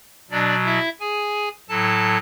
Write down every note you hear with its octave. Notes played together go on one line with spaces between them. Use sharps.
B2 F#3 D4 D5
E4 E5
G#4 G#5
A2 F#3 A4 A5